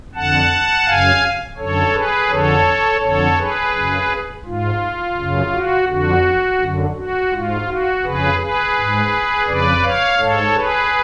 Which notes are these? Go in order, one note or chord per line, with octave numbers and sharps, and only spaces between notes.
F2 D3 F#5 A5
F#2 C#3 F5 G#5
F#2 D3 A4 C#5
G#4 B4
F2 D3 A4 C#5
F2 D3 A4 C#5
G#4 B4
F#2 C#3
G#2 F4
F#2 C#3
F#4
F2 D3 F#4
F#2 D3
F#4
G#2 F4
F#4
F2 C#3 G#4 B4
G#4 B4
G#2
F2 C#3 B4 D5
C#5 F5
G#2 A4 C#5
G#4 B4